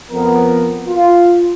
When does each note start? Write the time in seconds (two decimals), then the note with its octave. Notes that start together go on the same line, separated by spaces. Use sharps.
0.11 F2 B3 A#4
0.88 F4